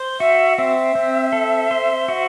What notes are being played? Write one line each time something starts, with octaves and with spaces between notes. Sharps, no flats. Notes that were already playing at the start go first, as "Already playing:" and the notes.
Already playing: C5
F#4 E5
C4 E5
C4
A4
C5
F#4